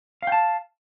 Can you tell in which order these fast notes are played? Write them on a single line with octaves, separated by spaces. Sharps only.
F5 G5 A5